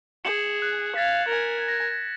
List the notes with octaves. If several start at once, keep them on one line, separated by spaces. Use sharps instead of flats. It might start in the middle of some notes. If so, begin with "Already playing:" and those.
G#4 C#7 E7 F#7
F#6
F5 G#6 A6 B6
A#4 G#5
A#6